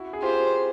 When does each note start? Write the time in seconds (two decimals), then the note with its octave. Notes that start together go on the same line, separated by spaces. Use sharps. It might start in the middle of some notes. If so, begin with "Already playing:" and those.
Already playing: E4 F#4
0.13 G#4
0.22 F4 G4 C5